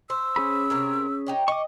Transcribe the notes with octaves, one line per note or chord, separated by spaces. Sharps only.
C5 E6
C#4 G#4 B5
C3 A#4 C#5
D#4 G4 C#5
D#5 C#6 D6